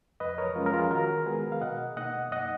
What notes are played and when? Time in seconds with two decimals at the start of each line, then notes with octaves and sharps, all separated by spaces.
0.20 F2 B4 D#5
0.38 A#4 C#5
0.55 F3 G#3 C#4 F4
0.66 A#4
0.73 F4 G#4
0.91 D#3 F#4 A#4
1.26 G#3 B3 G#4 B4
1.52 F5
1.61 B2 D#5 F#5
1.97 A#3 D#4 D#5 F#5
2.31 F#2 D#5 F#5